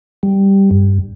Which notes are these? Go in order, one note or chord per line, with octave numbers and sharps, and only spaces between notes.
G3
G2